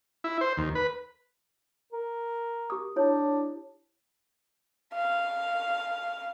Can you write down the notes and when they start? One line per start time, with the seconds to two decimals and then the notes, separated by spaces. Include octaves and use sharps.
0.24 E4
0.41 C5
0.57 D#2
0.75 B4
1.93 A#4
2.70 G4 D#6
2.96 D4 E4 C#5
4.95 F5